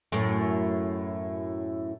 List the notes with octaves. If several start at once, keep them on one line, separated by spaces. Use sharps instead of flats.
F#2 A2